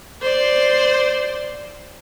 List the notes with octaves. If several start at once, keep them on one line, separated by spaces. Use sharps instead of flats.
C5 D5